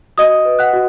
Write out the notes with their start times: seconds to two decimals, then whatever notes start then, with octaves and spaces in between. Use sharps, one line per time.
0.18 F#4 D#5 D#6
0.45 B4
0.59 F#5 F#6
0.73 F#4